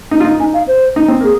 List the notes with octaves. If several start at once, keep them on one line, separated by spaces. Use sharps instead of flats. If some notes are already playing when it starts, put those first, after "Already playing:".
D#4
F4
D#4
D#4 G#5
F5
C5
D#4
C4
A#3 G#4